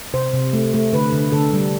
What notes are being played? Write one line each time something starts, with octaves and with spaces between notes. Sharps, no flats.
C3 C5
C3
A3
A3
D3 B4
D3
D3 A4
G3